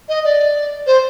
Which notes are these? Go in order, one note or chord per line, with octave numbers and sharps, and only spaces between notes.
D#5
D5
C5